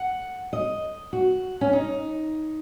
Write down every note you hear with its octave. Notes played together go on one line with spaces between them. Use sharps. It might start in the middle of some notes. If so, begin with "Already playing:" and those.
Already playing: F#5
D#5
F#4
C#4
D#4